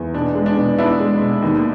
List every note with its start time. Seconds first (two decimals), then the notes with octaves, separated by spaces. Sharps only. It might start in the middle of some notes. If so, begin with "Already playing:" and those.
Already playing: E2
0.14 B2 D4
0.35 G#3
0.46 D4
0.57 B2
0.78 B3 D4 E4
1.00 G#3
1.20 B2
1.42 D#2